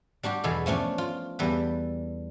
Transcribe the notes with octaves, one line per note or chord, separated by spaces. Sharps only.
G3 D4 F#4 G4
E2 B2 B3 G#4 A4 B5
F3 A3 C#4 D4
F4
E2 G3 A4 B4